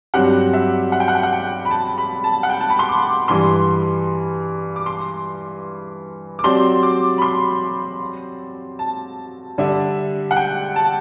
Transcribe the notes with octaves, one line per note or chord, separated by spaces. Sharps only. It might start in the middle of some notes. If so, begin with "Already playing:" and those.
G2 F#3 C4 G4 F#5
E5
F#5
G5
F#5
G5
F#5
G5
B5
A5
B5
A5
F#5
G5
A5
B5
C6
D6
G2 E3 G3 C6
D6
C6
D6
F#3 C4 G4 D5 C6
D6
B5
C6
A5
D3 G3 D4 A4 E5
F#5
G5
A5